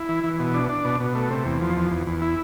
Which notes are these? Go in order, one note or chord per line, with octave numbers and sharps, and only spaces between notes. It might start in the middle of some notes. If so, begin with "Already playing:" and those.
Already playing: E4
E3
E3
B2
D4
D4
B2
B2
A3
C3
E2
F3
E2
E2
E2
E4